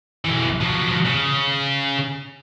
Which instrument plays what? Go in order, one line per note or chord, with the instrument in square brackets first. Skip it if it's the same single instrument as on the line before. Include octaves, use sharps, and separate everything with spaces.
[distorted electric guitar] B1 E3
F3 F#3
C#3